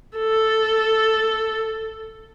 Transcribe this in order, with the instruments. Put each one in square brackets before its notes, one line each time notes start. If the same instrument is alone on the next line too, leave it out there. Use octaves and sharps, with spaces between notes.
[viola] A4